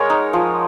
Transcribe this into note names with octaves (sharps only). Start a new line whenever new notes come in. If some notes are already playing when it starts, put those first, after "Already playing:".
Already playing: G#3 G#4 A#4 C#5 F#5
D#4
F3